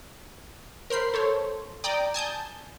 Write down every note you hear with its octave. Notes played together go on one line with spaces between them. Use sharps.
A#4 C5 B5 C7
A4 C5 C#5
D5 G5 A#5 D6 D#6
G#5 A5 D#6 G6